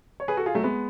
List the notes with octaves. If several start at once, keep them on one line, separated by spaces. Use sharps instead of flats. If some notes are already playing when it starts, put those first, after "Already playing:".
C#5
G#4 B4
F#4 A4
F4 G#4
F#3 A3
G#3 B3